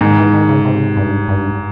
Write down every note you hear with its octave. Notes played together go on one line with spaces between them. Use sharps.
G#2 D#3
E3
D#3
C#3
C3
G2
G2